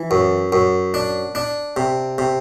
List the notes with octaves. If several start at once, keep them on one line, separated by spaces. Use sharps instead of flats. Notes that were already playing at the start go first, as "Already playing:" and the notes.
Already playing: E3
F#2
F#2
D4
D4
C3
C3